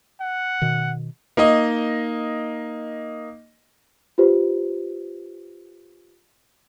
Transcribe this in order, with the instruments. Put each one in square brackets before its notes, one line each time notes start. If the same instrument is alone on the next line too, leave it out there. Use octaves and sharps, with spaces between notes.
[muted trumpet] F#5
[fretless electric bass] B2 D#3
[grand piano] A#3 D#4 D#5
[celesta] F4 G4 B4 C5